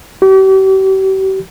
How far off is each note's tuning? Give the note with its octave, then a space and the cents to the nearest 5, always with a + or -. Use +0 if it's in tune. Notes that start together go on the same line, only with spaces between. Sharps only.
G4 -40